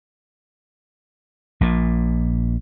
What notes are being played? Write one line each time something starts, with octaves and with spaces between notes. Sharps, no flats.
A#1 A#2